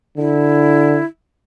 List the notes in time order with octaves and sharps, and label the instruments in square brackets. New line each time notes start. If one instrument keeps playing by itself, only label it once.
[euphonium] D3 [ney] E4